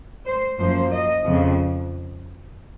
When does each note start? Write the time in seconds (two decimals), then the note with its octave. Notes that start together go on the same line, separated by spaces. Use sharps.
0.25 C5
0.59 F#2 F3 A#3 C5
0.91 D#5
1.24 F2 C#3 F3